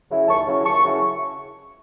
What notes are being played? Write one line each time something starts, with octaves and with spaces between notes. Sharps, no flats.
C#3 F#3 C#4 E4
D#2 A5 C#6
C#3 F#3 C#4 E4
D#2 A5 C#6
C#3 F#3 C#4 E4